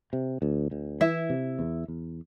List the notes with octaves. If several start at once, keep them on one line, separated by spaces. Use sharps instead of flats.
C3
D2
D2
E3 E4 E5
C3
E2
E2